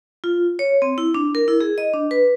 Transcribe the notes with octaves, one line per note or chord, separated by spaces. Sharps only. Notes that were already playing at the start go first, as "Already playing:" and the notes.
F4
C#5
C4
E4
D4
A#4
E4
G#4
D#5
D4
B4